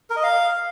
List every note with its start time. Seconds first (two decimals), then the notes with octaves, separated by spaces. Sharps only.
0.10 A#4
0.17 D#5
0.23 F5